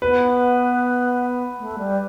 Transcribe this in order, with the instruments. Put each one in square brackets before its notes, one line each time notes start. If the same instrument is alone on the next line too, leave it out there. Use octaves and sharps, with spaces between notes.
[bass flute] B3 [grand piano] B4
[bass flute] A3
G3